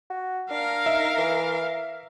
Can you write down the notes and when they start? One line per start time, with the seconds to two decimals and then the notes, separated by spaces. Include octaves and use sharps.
0.10 F#4
0.50 D4 A#4 F5
0.86 D#4 E5
1.18 E3